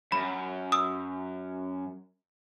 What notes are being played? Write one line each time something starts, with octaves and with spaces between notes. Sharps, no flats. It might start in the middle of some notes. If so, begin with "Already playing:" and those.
F#2 B5
D#6 E6